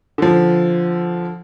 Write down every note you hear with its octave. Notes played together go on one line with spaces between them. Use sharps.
D3 F3